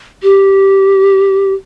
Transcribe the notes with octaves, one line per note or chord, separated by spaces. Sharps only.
G4